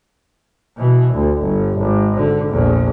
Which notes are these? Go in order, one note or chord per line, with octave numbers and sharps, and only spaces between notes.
B2 E3
D2
G1
G#1
D3
A#1 E2